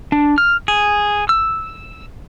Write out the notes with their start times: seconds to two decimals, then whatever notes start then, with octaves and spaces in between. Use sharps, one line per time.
0.12 D4
0.38 F6
0.68 G#4
1.29 E6